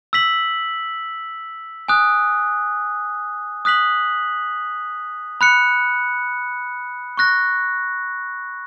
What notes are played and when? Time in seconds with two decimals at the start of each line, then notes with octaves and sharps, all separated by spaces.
0.13 E6 B6 F#7
1.88 G#5 D#6 F#6
3.65 D#6 F#6 B6 F#7
5.41 B5 F#6 C#7
7.17 C#6 F#6 A#6